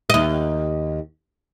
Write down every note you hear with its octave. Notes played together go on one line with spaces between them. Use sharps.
D#2 D#5